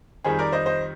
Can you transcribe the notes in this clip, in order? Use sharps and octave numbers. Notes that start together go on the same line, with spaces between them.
F2 D#3 G3 G#4 C5
A#4 D5
C5 D#5
C5 D#5